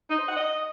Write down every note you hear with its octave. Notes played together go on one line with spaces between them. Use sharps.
D#4
C5
F#5
D#5